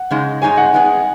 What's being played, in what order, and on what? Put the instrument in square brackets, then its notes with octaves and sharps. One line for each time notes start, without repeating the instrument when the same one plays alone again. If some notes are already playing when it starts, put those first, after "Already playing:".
Already playing: [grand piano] F#5
[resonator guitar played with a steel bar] C#3 G#3 D#4
[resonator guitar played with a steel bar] G#2 G#3 D#4 G#4 C#5 [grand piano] G#5
[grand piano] F#5
[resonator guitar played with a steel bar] G#2 G#3 B3 D#4 G#4